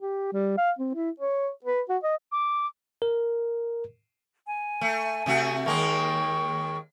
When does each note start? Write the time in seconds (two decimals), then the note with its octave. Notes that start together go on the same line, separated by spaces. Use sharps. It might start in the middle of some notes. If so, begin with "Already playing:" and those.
0.01 G4
0.33 G3
0.57 F5
0.79 C4
0.94 E4
1.20 C#5
1.64 B4
1.89 F#4
2.03 D#5
2.32 D6
3.02 A#4
4.47 G#5
4.81 A3
5.26 C3 A3 F#4
5.66 D#2 G#3 A#3 G#4 G5 C#6